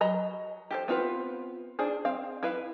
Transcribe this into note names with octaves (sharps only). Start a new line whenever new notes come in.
F#3 D#5 A#5 B5
G4 A4 C5
B3 C4 F4 G#4 B4
D4 G#4 C5
C4 F5
E4 B4 F5